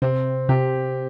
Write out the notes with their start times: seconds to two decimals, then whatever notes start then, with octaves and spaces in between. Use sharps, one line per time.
0.02 C3 C4
0.49 C3 G4